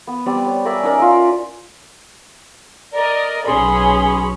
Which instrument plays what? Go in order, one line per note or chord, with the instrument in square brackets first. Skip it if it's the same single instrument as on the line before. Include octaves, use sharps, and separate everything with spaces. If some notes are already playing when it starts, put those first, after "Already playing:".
[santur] B3
G3 B3 C4 D5
C#5
A#4 D5 E5 G#5
C#4 D#4 A#4 D5
F4 A#4 E5
[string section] A#4 D#5 [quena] D5
[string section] B1 C#4 B5 [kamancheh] G#4 [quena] C6